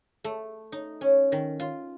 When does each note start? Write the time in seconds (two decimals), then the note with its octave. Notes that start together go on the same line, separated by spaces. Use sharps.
0.24 A3
0.72 D#4
1.01 C#4
1.32 D#3
1.60 F4